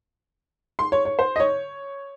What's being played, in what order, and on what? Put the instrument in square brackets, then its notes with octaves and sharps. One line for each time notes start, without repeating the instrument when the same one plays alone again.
[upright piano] C6
C#5
C#5
C5
D#5
C#5